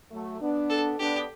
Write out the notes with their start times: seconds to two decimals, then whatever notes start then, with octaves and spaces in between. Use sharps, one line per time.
0.12 F#3 A3
0.41 B3 D4
0.70 A4
0.99 B3 D4 G4